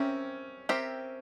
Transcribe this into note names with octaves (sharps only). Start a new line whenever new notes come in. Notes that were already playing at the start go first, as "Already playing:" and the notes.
Already playing: C4 C#4 G4 A#4 E5
C4 G4 A#4 E5